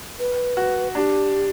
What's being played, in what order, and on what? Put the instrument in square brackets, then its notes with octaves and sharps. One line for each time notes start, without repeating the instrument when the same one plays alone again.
[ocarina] B4
[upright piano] F#4
[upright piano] D4 [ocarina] G4